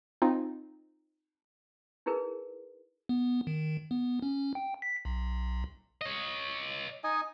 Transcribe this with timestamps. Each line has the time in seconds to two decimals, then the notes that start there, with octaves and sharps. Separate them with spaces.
0.22 C4 D#4 F4
2.06 D#4 E4 G#4 A#4 B4
3.09 B3
3.47 D#3
3.91 B3
4.22 C#4
4.55 G5
4.82 B6
5.05 B1
6.01 C#5 D#5
7.04 D#4 D#5 G#5